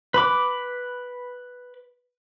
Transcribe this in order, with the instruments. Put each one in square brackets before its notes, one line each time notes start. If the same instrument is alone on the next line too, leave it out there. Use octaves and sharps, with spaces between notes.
[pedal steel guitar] B4 B5 D6